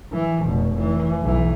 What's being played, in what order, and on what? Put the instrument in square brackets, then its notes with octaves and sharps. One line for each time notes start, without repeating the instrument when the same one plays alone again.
[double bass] E3
F1 B2
E3
B1 E3